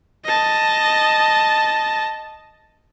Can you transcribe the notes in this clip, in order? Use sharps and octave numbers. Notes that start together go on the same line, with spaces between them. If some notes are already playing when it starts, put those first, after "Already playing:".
D#5 A5